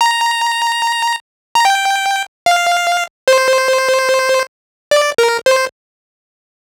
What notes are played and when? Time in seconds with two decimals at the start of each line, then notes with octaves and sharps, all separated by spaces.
0.01 A#5
1.55 A#5
1.65 G5
2.46 F5
3.28 C5
4.91 D5
5.18 A#4
5.46 C5